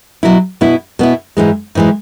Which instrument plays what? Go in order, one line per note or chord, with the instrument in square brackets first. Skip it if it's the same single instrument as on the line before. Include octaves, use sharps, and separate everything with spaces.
[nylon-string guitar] B2 F#3 E4
B2 B3 E4
B2 B3 E4
G#2 E3 G#3
G#2 E3 G#3